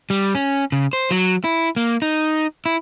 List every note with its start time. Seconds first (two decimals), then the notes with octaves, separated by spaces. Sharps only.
0.10 G3
0.35 C#4
0.72 C#3
0.93 C5
1.11 F#3
1.44 E4
1.76 A#3
2.02 D#4
2.66 E4